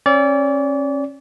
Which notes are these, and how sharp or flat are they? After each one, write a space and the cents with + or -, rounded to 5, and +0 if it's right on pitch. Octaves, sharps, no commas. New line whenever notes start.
C#4 -30 D5 -30